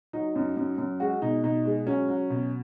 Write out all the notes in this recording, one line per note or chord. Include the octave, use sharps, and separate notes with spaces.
F#3 D#4
F#2
F#2
F#2
G#3 F#4
B2 D#4
B2 D#4
G#3
F#3 C#4
F#3
B2